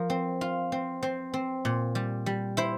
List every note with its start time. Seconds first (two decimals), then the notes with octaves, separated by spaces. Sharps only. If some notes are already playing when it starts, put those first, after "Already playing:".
Already playing: F3 A#4
0.10 C4
0.41 F4
0.72 C4
1.03 C4
1.34 C4
1.65 A#2
1.95 G3
2.26 G3
2.57 E4 C5